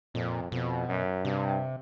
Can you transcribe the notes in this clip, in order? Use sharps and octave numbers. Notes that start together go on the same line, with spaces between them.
F2 A#2
F2 B2
F#2
G2 C3